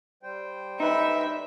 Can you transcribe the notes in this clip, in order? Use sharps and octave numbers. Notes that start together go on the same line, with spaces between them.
G3 C5 G5
D#4 B4 E5